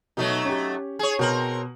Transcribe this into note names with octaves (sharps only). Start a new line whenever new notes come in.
B2 F#3 A3 D#4
C#4 G4
G#4 C#5
B2 C4 A#4 A#5 F#7